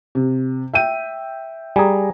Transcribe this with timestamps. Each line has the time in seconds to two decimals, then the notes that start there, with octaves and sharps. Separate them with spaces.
0.15 C3
0.73 E5 G5 D#7
1.76 G3 G#4 G#5 A#5